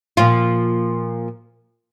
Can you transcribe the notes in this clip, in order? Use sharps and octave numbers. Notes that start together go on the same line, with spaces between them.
A#2 F3 F4